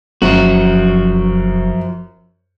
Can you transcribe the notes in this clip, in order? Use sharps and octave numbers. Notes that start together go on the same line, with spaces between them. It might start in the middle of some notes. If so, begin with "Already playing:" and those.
F1 F#2 F3 F#4